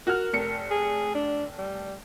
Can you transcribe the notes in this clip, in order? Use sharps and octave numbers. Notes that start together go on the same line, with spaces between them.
F#4 A#4 F6
F1 C#7
G#4
D4
G3